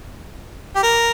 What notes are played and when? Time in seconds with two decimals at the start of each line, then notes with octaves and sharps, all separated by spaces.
0.76 G4
0.83 A#4